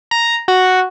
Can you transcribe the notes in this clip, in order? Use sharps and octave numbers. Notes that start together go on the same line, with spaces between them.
A#5
F#4